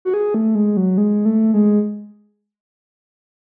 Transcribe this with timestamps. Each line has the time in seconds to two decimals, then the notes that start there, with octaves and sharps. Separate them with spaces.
0.05 F#4
0.14 G#4
0.34 A3
0.55 G#3
0.77 F#3
0.98 G#3
1.25 A3
1.54 G#3